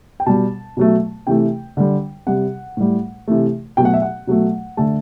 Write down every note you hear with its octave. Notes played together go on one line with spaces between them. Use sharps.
G5
B2 G3 A5
B2 F#3 A3
C3 E3 A3 G5
D3 G3
C3 G3 F#5
A2 G3
C3 E3 A3
B2 F#3 A3 G5
F#5
E5
F#5
B2 F#3 A3
D3 A3 A5